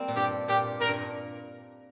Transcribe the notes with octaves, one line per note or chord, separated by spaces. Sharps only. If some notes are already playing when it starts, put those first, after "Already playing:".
Already playing: G3 A#3 C4
A#2
G2 G4
A#2 G4
A#2 A#4
G2